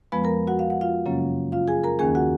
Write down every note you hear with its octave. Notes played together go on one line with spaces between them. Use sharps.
F2 F3 G#3 B3 B4 B5
A#4 A#5
F#4 F#5
F5
F#5
F4 F5
F#2 C#3 F#3 A#3 C#4
F4 F5
G#4 G#5
A#4 A#5
D#2 D#3 A#3 C#4 G#4 G#5
F#4 F#5